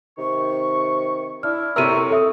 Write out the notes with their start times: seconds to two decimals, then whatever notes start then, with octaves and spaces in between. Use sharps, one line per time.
0.18 C3 D#3 C#6
1.43 D4 E4 F6
1.76 F#2 A2 C3 E4 A#4 C#6 E6 D#7
2.10 A4 E5 D#6